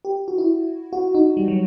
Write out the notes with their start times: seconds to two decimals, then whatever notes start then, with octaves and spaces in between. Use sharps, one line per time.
0.05 G4
0.28 F#4
0.38 E4
0.93 F#4
1.15 D#4
1.37 G3
1.48 F#3